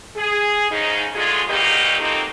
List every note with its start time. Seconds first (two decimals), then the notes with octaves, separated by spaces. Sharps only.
0.16 G#4
0.71 G#2 C#3 D#4
1.16 D3 F#3 G#3 A3 F4 G#4
1.48 A#2 F#3 A#3 B3 D#4 G4
1.99 F3 F#3 A3 A#3 C4 D#4